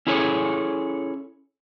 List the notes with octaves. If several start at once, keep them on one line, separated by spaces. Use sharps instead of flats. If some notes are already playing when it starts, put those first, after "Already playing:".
C#4 E4 G#4 A4 C#5